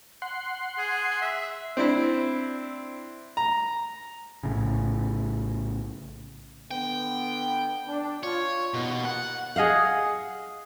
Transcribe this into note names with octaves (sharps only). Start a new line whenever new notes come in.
F#5 C6
G#4
E5
C4 D4 E4
A#5
A#1 A2 C#3
D3 B3 G5
D4
F4 C#5
D#2 B2
F#5
G#4 D#5 F5 F#5